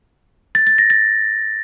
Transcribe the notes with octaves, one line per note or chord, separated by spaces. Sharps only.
A6
A6
A#6
A6